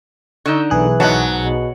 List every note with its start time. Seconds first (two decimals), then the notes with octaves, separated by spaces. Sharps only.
0.46 D3 D#4 C#6 E6 G6
0.70 B1 E3 G#4 F#6
1.00 G#2 F#3 B3 A5
1.39 B2